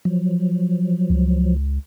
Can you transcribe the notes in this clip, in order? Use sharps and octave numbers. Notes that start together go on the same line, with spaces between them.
F3 F#3
C#2